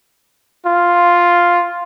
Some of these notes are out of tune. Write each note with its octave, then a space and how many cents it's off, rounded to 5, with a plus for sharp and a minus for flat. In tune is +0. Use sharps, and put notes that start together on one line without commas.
F4 +0